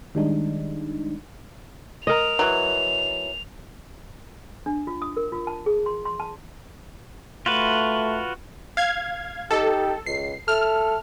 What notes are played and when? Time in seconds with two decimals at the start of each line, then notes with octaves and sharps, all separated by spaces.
0.15 D#3 G3 G#3 D4 D#4
2.07 A#4 D#5 F7
2.39 E3 F#3
4.66 D4
4.87 F4
5.02 D#6
5.17 A#4
5.32 F4
5.47 A5
5.66 G#4
5.86 C6
6.05 C6
6.20 A5
7.46 A3 F4 F#4 B4
8.77 F5 G#6
9.51 D#4 G4 A4
10.06 C#2 C7
10.48 A4 E5 A5 F6